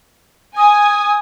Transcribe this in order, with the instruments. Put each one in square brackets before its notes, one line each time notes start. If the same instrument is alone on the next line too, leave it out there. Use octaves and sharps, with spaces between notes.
[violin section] G#5 [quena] D#6